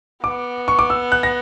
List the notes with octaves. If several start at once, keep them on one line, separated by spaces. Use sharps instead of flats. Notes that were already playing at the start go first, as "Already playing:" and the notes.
B3 D6
C#6
D6
E6
F#6
A#6